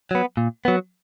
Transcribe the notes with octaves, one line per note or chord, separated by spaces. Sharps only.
F#3 B3
A#2
F#3 B3